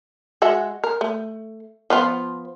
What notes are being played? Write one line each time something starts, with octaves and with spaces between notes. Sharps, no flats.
G#3 F#4 E5
A#4
A3
F3 B3 F4